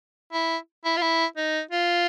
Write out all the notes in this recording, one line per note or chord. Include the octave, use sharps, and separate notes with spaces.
E4
E4
F4
E4
D#4
F4